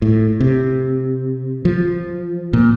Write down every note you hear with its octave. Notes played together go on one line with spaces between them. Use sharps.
A2
C3
F3
A#2